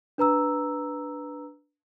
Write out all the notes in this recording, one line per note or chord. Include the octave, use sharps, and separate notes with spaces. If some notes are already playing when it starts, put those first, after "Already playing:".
D4 B4 A#5 E6